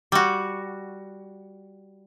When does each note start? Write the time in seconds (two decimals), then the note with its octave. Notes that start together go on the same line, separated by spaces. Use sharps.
0.12 G3 F#4